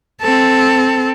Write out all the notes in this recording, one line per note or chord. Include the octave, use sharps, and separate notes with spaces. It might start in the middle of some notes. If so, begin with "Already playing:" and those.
C4 A4